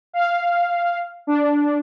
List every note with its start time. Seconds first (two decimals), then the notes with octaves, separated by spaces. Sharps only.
0.13 F5
1.27 D4